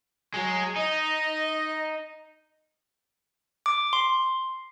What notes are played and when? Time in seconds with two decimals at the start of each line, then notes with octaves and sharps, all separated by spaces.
0.34 F#3 G#3
0.76 D#4 D#5
3.66 D6
3.93 C6